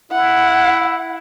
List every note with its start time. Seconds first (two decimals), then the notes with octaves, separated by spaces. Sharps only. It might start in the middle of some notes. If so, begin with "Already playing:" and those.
0.12 E4 F#5